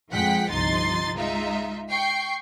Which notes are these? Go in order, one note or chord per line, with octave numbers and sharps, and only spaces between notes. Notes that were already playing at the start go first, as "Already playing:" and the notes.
F2 F3 G#3 F#5 G5 B6
G1 C2 F3 D#4 C6 A6
G#3 D#4 F4 E5
G5 C#6 C7